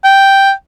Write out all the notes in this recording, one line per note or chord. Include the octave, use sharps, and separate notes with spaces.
G5